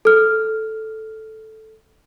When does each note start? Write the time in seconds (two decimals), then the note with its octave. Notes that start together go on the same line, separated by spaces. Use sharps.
0.05 A4 F6